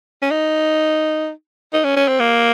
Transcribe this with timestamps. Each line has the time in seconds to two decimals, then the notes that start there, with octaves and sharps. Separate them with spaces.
0.22 C#4
0.31 D#4
1.73 D#4
1.84 C#4
1.97 C#4
2.08 C4
2.20 A#3